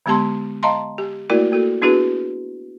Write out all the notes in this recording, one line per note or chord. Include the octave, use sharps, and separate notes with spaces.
D3 G#3 B3 G4 A5 C6
D#5 F5 A5 A#5 C6
G4
A3 A#3 E4 F#4 A#4 D5
A#3 F#4 A4
B3 D4 E4 F#4 G#4 B4